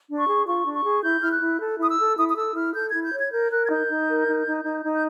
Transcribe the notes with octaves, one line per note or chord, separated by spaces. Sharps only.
D4
C#6
G#4
F4 C#6
D4
C#6
G#4
E4 G6
E4 F6
F#6
E4
A4
E4 D#6
E6
A4
E4 D#6
D#6
A4 E6
E4 F6
A4 G6
E4 G#6
G6
C#5
G#6
A#4 G6
A#4 F#6
G#6
D#4 G6
D#4
A#4
D#4
D#4
D#4
D#4
G6